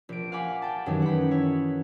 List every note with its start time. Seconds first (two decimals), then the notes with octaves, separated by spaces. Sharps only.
0.09 A#1 D7
0.32 F5 F#5 G#5 B5 D6
0.62 G5 A5
0.86 F#2 D#3 E3 F#3 G3 D#4
1.02 F#5 B5
1.31 E4 C#5